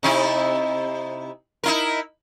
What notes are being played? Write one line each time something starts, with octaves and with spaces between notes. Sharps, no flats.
C3 D#4 E4
D#4 E4 A#4